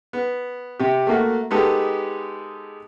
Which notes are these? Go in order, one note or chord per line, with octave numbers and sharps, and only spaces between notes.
B3
C3 G4
A3 A#3 F#4
G#3 B3 D#4 G4 A4